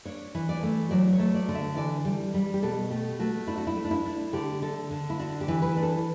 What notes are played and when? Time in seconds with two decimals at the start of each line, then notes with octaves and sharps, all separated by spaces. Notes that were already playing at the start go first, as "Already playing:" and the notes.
0.05 D4 C#5
0.35 E3
0.49 D5
0.63 A3
0.91 F#3 D5
1.13 C#5
1.19 A3
1.34 D5
1.49 D3
1.55 E5
1.76 E3 D5
2.05 G3
2.34 G3
2.54 G4
2.63 B2 A4
2.91 A3 G4
3.19 A3 F#4
3.47 D4 E4
3.58 F#4
3.67 E4
3.76 A3
3.84 D4
3.91 E4
4.06 D4
4.33 D3 G4
4.62 D3 A4
4.91 D3
5.10 E4
5.19 D4 F#4
5.41 G4
5.48 E3
5.62 B4
5.76 D4
5.83 A4